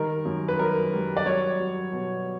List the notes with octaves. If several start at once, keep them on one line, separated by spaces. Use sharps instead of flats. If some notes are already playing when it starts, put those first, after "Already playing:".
Already playing: D#3 G3 A#4
F#2
B4
F#2 A#4
G3
D5
F#3 C#5
F#3
B2